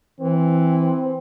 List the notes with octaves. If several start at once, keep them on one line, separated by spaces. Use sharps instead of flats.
E3 C4